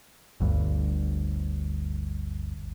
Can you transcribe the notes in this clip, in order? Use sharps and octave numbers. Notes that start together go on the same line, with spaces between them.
G1 D2 G2